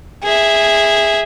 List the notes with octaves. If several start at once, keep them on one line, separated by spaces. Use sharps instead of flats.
G#4 E5